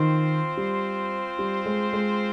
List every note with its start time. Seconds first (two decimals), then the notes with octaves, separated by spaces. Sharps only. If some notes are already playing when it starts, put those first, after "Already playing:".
Already playing: D#3 C4 F4 C5
0.57 G3
1.39 G3
1.65 G#3
1.93 G#3